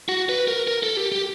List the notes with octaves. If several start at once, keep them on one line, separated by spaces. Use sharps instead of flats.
F#4
B4
A#4
A#4
A4
G4
G4